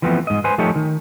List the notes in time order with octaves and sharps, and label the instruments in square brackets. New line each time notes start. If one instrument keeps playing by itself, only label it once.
[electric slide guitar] E3 F3 A3 B3 C4
G#2 D#5
B4 C5 G#5
F3 A3 D#4 G4 A4 C#5
D#3